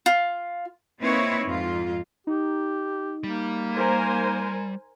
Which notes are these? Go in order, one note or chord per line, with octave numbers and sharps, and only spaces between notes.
F4
A#3 C4 D#4 E4 B4 C#5
F2 G#2 F4
D#4 G4
G3 A#3
A#4 C5 G#5